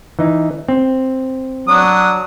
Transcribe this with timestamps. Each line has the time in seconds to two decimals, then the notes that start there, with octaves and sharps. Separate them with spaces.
0.19 E3 D#4
0.68 C4
1.68 F#3 D4 D#6